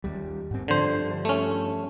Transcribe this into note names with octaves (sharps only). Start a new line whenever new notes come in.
D#2 G3
G#2 C4
G2 D3 F3 C5
A3 C#4